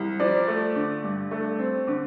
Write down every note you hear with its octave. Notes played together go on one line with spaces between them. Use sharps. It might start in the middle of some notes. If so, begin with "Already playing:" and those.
Already playing: C2
F3 D5
A3
D3
G2
A3
C4
D3